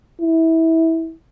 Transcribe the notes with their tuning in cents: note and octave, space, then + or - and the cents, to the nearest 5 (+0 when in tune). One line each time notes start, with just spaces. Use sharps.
E4 -20